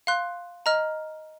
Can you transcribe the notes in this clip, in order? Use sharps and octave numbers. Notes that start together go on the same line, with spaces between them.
F5 C6 F#6
D#5 A#5 F6